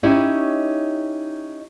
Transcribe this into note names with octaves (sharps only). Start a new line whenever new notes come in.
C#4 D#4 E4 G4 C#5